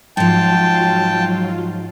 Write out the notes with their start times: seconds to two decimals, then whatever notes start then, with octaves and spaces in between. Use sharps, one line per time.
0.17 G#2 F3 F#3 F4 G5 A5